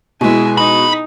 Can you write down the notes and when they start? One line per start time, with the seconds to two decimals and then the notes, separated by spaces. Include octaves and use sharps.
0.21 B2 G#3 E4 G#5
0.57 D#4 B5